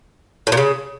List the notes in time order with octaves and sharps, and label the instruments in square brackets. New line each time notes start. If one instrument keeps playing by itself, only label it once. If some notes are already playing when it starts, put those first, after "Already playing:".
[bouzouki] A2
A#2
C#3